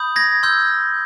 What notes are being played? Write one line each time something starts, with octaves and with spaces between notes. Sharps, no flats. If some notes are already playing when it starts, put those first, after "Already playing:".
Already playing: B5 D#6 G6
G#6 A#6
C6 E6 G6